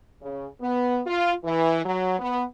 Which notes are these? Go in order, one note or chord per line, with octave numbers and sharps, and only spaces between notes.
C#3
B3
F4
E3
F#3
B3